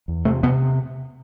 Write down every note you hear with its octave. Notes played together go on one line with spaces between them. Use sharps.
E2
C3 A3
C3 B3